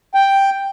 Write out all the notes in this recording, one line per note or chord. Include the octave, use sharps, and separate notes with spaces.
G5